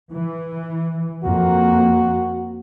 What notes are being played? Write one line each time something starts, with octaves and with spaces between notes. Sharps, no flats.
E3
F2 A#3 F#4